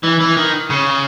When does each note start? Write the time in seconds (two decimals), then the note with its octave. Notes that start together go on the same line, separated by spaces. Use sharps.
0.03 E3
0.20 E3
0.37 D#3
0.70 C#3